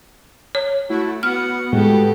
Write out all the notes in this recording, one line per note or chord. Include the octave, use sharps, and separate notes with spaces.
C#5
A3 E4 F#4
B3 F#4 F#5 F6
A2 G#3 A3 G4 A4